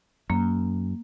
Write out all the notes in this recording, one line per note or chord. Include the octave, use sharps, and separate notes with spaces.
F#2 A#3